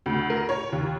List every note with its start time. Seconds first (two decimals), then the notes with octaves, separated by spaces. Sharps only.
0.06 D2
0.30 A#4
0.49 C#5
0.72 D#2